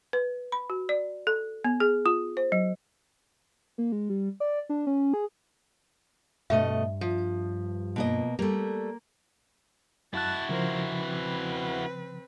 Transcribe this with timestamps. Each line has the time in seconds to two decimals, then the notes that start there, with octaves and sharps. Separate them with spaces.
0.13 B4
0.52 B5
0.70 F#4
0.89 D5
1.27 A4
1.64 B3
1.80 G#4
2.06 F4
2.37 C5
2.52 F#3
3.78 A#3
3.92 G#3
4.10 G3
4.40 D5
4.69 D4
4.87 C#4
5.14 G#4
6.50 G2 B2 A3 D#5 E5
7.01 F3
7.96 B2 A#3 D#5
8.39 G3 A3 A#3
10.14 F#2 E4 F#4 A5 F#6
10.49 C#3 F3 A#4 C5
10.95 C4 B4